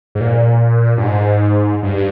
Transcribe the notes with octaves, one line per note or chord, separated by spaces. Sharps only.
G#2
A#2
G2
G#2
G2